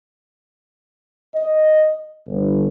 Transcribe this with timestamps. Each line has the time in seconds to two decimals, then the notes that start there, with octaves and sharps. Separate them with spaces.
1.35 D#5
2.28 G1